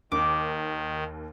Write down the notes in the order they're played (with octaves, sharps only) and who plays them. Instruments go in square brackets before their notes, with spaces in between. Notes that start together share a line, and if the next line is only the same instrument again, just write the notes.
[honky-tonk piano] D#2 [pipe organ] D#3 [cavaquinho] D6